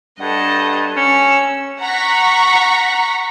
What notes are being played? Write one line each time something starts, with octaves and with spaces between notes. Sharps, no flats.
G2 A4 D#5 F#5
C#4 E6
F#5 A#5 C#6 B6